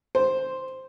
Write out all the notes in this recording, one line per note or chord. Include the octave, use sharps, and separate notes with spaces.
C5